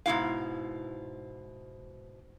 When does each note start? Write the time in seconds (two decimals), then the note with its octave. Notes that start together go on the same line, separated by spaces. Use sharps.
0.06 G#2 B2 E4 F5